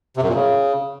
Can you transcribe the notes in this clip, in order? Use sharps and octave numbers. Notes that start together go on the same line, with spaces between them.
C3
F#2
A#2
C#3